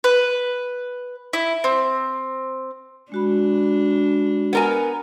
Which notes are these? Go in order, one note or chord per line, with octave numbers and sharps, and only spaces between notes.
B4
E4
C4
G#3 D4 F#4 B5
B3 A#4 G#5